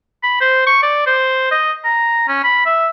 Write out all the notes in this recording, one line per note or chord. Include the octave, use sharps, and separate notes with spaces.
B5
C5
C#6
D5
C5
D#5
A#5
C#4
B5
E5